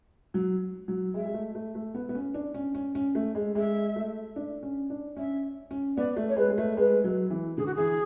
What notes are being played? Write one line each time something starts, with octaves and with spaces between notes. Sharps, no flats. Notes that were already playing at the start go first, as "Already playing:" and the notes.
F#3
F#3
G#3 E5
G#3
A3
A3
A3
B3
B3
C#4
D4
C#4
C#4
C#4
A3
G#3
G#3 E5
A3
D4
C#4
D4
C#4 E5
C#4
B3 D5
A3
C#5
G#3 B4
G#3
A3
A4
G#3 B4
F#3
E3
D3 G#4
F#4
E3 G#4